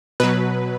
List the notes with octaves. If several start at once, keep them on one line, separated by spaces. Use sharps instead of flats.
B2 F#3 B4